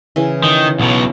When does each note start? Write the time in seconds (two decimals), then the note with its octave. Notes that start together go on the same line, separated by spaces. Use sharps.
0.16 C#3 E3
0.44 D#3
0.80 B1 B2